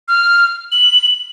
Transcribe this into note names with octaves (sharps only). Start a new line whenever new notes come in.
F6
F#7